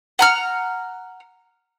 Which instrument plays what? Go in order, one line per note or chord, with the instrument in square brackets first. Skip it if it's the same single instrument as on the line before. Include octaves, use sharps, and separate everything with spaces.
[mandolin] F#5 A#5 F6